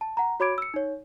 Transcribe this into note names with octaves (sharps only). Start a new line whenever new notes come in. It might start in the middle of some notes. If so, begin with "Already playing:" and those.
A5
F#5 A#5
F#4 C#5 B5 D6 G#6 D7
E6 C#7
D#4 C#5